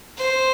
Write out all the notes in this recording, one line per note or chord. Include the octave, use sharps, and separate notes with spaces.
C5